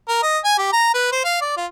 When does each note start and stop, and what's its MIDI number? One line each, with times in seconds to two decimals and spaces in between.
0.08 0.19 70
0.22 0.38 75
0.44 0.55 80
0.58 0.68 67
0.72 0.91 82
0.94 1.12 71
1.12 1.22 72
1.24 1.39 77
1.41 1.55 74
1.57 1.66 65